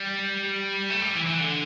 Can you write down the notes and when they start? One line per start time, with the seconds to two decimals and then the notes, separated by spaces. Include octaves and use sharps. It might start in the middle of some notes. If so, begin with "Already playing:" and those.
Already playing: G3
0.90 A3
1.02 G3
1.15 E3
1.26 E3
1.39 D3